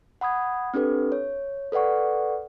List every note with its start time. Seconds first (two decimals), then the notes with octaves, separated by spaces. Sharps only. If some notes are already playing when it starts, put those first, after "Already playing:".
0.21 F#5 B5 D#6 G#6
0.74 C4 D4 G4 A4 B4
1.12 C#5
1.72 A4 B4 D5 F#5 C#6